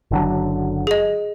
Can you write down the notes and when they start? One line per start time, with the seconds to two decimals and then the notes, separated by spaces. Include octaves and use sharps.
0.11 F#1 D3 F#3
0.87 G#4 D#5